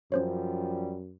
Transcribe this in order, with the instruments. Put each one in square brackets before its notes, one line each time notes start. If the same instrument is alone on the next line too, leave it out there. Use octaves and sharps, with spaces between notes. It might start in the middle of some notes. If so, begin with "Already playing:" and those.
[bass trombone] F#2 [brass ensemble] F3 G3 [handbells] C#4 C5 C#5